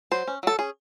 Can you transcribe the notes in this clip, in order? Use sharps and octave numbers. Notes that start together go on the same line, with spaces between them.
F#3 C5
C#4
F#3 A4
C#4 G#4